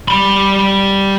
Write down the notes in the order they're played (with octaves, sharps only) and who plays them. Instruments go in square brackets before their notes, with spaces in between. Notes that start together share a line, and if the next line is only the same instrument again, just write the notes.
[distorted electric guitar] G3 B5